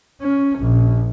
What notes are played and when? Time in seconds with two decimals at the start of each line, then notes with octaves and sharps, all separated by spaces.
0.21 C#4
0.59 A#1